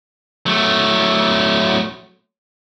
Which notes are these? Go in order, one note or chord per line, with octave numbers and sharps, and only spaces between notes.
F#3 A3